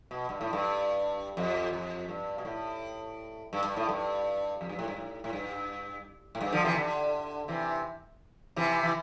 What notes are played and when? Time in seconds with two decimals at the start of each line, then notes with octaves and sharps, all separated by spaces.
0.11 B2
0.29 G2
0.41 A2
0.53 G2
1.37 F2
1.73 F2
2.09 G2
2.38 B2
2.45 A2
3.53 G2
3.64 G2
3.76 A2
3.89 G2
4.61 F2
4.69 G2
4.79 A2
4.88 G2
4.96 A2
5.24 A2
5.33 G2
6.35 A2
6.41 G2
6.52 D3 F3
6.65 C3 E3
6.77 D3
7.48 C3 E3
8.56 C3 E3
8.83 E3